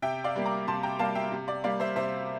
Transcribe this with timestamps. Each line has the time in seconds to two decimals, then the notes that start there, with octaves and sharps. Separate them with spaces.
0.02 C3 E5 G5
0.24 D5 F5
0.36 G3 A#3
0.45 A#5 D6
0.67 C3 A5 C6
0.83 G5 A#5
0.99 G3 A#3 F5 A5
1.15 E5 G5
1.32 C3
1.48 D5
1.64 G3 A#3 D5 F5
1.80 C5 E5
1.96 C3 C5 E5